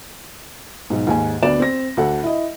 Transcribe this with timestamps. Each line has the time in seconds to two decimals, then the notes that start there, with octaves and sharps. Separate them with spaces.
0.90 B1 G#2
1.07 D#2 G#2 G#5
1.42 D2 B3 D5 E7
1.60 C4 A#6
1.97 D2 D4 A4 F#5
2.24 E4 D#5